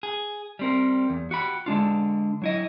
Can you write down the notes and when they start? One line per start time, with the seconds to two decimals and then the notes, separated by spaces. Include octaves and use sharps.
0.03 G#4
0.59 G3 C4 A#4
1.10 E2
1.31 F#4 G4 B5
1.66 D3 G#3 D4 F4
2.42 F#3 E4 D#5